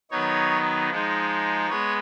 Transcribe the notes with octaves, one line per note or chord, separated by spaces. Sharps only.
D#3 F#3 B3 D#4 C#5
F3 G#3 D#4
G#3 B3 C#5